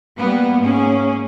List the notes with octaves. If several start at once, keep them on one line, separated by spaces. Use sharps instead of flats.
G3 A#3 B3
G#2 A#3 C#4 G#4